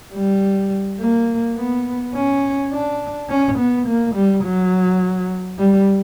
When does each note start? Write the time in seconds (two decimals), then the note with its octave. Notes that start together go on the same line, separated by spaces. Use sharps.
0.14 G3
1.00 A#3
1.57 B3
2.15 C#4
2.72 D4
3.30 C#4
3.59 B3
3.87 A#3
4.15 G3
4.44 F#3
5.59 G3